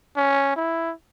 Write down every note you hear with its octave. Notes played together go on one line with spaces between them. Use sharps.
C#4
E4